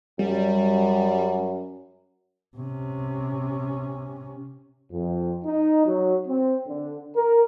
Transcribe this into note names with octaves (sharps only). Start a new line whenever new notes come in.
F#2 G3
C3 C#4
F2
D#4
F#3
C4
D3
A#4